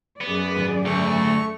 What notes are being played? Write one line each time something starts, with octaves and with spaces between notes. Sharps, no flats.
F#2 B3 G#4 D5
G#2 D#3 F#3
D2 A3 C#6